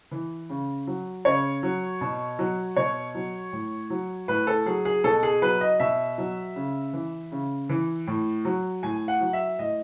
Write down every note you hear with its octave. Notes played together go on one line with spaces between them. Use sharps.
E3
C#3
F#3
C#3 C#5
F#3
B2
F#3
B2 C#5
F#3
A2
F#3
A2 B4
A4
F#3 G#4
G#4
B2 A4
G#4
F#3 B4
D#5
B2 E5
F#3
C#3
E3
C#3
E3
A2
F#3
A2 G#5
F#5
F#3
E5
A2 D#5